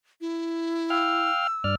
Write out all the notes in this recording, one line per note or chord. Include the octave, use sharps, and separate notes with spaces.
E4
F5 G5 E6 F6
G2 D5 F6